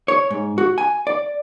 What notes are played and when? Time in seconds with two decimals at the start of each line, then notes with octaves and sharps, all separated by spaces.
0.08 C#5
0.31 G#2
0.58 F#4
0.78 G#5
1.07 D5